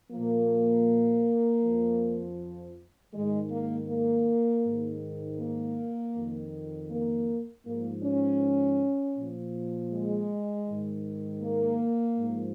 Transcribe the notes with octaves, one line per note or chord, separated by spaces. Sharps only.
A#2 F3 A#3
F2 F3
G#2 D#3 G#3
A#3
A#3
G#2 D#3
A#3
F2 D#3
A#3
G#2 F3 A#3
C#4
A#2 F3
G#3
G#2 D#3
A#3
G#2 F3